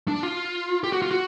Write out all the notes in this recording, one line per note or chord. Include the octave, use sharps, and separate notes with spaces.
D4
F4
G4
F#4
F4
F#4